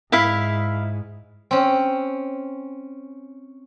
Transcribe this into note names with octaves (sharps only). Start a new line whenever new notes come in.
G#2 E4 E5 F5
C4 C#4